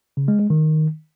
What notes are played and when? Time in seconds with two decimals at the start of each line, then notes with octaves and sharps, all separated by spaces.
0.17 C#3
0.28 G#3
0.39 G#3
0.50 D#3